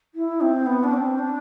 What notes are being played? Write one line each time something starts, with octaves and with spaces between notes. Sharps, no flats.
E4
C4
B3
D4
C4
D4